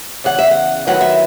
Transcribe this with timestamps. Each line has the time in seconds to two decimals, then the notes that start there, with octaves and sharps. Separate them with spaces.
0.24 E2 C#3 F#5
0.39 E5
0.51 F#5
0.87 D#3 F#3 B3 E4 F#5
1.01 E5